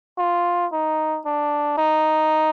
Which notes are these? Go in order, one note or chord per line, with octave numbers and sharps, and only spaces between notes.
F4
D#4
D4
D#4